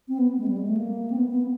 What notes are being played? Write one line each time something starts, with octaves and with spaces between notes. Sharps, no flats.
C4
B3
G#3
G3
G#3
A3
A#3
C4
B3
B3